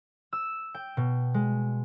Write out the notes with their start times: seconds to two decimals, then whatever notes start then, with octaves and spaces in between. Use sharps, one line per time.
0.33 E6
0.74 G5
0.97 B2
1.34 G#3